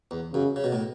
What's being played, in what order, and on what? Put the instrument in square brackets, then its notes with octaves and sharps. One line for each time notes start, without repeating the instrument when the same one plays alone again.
[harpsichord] E2
[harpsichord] F#2 [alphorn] C#3
[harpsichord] C#3
B2
A2